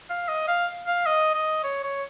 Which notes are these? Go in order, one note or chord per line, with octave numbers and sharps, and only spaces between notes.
F5
D#5
F5
F5
D#5
D#5
C#5
C#5